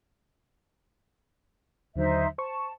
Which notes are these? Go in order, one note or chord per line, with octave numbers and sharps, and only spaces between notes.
D#2 D3 F#3 D#4 C5 E5
C5 A5 C#6